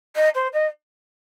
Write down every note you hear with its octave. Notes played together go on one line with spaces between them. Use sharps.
D#5
C5
D#5